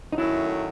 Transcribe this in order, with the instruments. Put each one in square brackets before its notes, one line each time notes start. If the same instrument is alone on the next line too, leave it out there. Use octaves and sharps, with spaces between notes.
[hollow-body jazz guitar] D#4
[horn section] F#2 D#3 F#3 A3 [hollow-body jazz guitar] E4